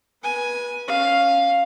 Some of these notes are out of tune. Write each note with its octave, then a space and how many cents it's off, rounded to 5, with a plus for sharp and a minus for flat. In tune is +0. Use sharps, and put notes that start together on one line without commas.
B4 -25 G#5 +5
C#4 -5 F5 +0